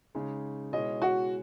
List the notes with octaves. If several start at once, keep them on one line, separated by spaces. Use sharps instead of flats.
C#3 G#3 D#4
B2 G#3 C#4 E4 D#5
F#4